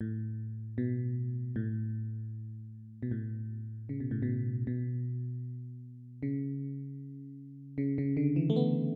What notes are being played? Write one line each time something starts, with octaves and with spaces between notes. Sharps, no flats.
A2
B2
A2
B2
A2
C#3
B2
A2
B2
B2
C#3
C#3
C#3
D3
E3
A3
B3